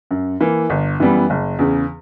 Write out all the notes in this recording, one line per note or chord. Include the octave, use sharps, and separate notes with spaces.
F#2
E3 A#3
G1
F#2 E3 G3 B3
F#1
E2 C#3